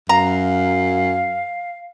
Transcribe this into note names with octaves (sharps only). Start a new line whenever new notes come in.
F#2 F5 A#5